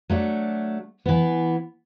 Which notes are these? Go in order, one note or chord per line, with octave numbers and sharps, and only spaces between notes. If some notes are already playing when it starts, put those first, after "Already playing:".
F#3 A3 D4
E3 B3